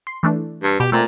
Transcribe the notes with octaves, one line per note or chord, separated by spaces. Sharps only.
C6
E3 A3 D4
G2
B2 G4
A#2 A3 C4